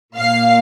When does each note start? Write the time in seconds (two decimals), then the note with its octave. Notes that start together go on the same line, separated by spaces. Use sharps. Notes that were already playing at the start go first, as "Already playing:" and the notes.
0.15 A#2 A#3 F5